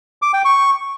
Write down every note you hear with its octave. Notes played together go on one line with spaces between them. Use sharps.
D6
G5
C#6